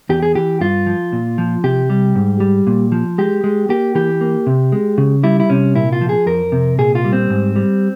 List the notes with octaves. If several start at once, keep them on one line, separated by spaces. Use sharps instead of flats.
E2 G4
G#4
E3 G4
G2 F4
F3
A#2
F3
C3 G4
G3
G#2
G3
A#2
F3
G#3 G4
G#3
A#3 G4
E3 G4
A#3
C3
G#3
C#3
G3 E4
E4
C3 C#4
A#2 E4
F4
F3
G#4
F2 A#4
C3
A#2 G#4
F4
G3
C4
G#2
G3